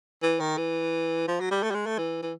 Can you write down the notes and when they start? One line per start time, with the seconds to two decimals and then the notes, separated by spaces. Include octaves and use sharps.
0.22 E3
0.40 D#3
0.57 E3
1.28 F3
1.40 F#3
1.51 G3
1.63 A3
1.71 G3
1.74 G#3
1.86 A3
1.98 E3
2.22 E3